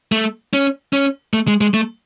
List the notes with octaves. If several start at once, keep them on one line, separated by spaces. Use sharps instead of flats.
A3
C#4
C#4
A3
G#3
G#3
A3